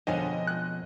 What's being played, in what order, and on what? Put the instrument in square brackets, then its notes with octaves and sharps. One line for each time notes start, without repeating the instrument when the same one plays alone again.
[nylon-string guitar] F2 B2 G#5 [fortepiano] D3 [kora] F3 G#3 C#4 [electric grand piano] D#5
[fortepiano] F#6